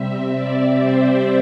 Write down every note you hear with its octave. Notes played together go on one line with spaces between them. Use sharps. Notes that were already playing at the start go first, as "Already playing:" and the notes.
Already playing: C3 G3 C4 E5
D5
C5